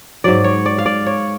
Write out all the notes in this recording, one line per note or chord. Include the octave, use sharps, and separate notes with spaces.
G#2 F#3 D5
C#5
D5
F5
D5
C#5